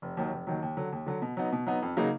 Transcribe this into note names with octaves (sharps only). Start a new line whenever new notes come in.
F1
D#2 D#3 F#3
F1
D#2 D#3 F#3
D#2
D3 F#3
D#2
D3 F#3
B2
F#3 B3 D#4
B2
F#3 B3 D#4
F2
C#3 F#3 A#3 D#4